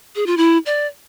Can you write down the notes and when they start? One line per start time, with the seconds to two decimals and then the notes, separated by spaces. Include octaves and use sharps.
0.15 G#4
0.26 F4
0.37 E4
0.66 D5